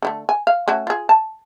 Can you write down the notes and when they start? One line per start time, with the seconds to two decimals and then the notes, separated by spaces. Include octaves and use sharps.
0.02 D3 G3 A3
0.29 G#5
0.47 F5
0.68 A3 C#4 F#4
0.87 F4 G#4
1.09 A5